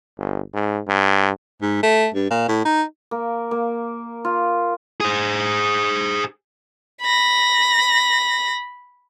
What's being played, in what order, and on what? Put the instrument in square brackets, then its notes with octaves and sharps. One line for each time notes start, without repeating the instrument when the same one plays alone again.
[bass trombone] G1
G#2
G2
[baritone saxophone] G#2
A3
G2
A#2
A2
D#4
[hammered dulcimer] A#3
A#3
F4
[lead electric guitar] G#4 C5
[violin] B5 A#6